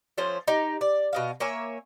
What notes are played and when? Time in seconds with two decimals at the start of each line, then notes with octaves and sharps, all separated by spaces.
0.18 F3 A3 C#4 C5
0.48 D#4 G4
0.81 D5
1.13 B2 D#5 F5
1.40 A#3 C#5 E5 G#5